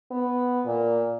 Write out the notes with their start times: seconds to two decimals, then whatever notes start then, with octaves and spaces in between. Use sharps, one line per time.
0.11 B3
0.66 A#2